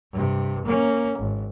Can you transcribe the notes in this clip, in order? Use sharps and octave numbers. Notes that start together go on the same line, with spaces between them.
G2 C3
A#3 C#4
G#1